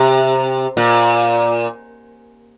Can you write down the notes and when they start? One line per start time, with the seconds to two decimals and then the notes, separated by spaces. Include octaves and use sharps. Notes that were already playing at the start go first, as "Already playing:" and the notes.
Already playing: C3
0.77 A#2